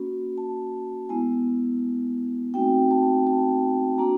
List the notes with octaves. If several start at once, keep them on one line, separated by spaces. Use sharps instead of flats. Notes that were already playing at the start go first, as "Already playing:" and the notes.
Already playing: A#3 C#4 F#4 B5
A5
G#3 B3 E4 G#5
A3 C4 D#4 F#4 G5
A5
A5
A#3 D4 F#4 A#5